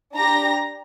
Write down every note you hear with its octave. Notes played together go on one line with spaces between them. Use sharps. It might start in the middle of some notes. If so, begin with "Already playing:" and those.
D4 G4 A#5 A#6